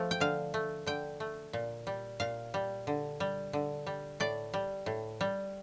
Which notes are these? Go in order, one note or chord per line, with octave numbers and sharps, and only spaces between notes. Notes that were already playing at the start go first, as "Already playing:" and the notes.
Already playing: F3 A3
G5
D3 F5
A3
D3 G5
A3
A#2
G3
A#2 F5
G3
D3
G3
D3
G3
A2 D5
G3
A2
G3